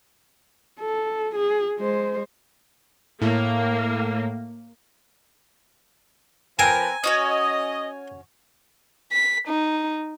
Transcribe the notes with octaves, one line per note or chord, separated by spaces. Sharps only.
A4
G#4
G#3 C5
A2 A#3
F3 C4 A#4 B4 G#5 A5
C#4 F#4 C#5 D#5
B6
D#4